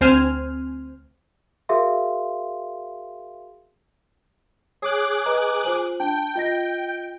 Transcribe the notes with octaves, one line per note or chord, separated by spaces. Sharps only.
D2 C4 C5 G#5 F6
F#4 G#4 A#4 E5 F5 C6
G#4 C#5 D6 F#6
B4 D#5 A#5
F4 C5 F#7
D4 G5 A5
F4 D#5 A#6